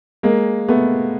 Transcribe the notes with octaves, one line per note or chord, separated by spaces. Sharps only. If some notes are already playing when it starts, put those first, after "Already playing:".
G#3 A#3
A3 B3